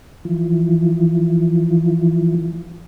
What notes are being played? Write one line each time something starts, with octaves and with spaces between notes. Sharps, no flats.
E3 F3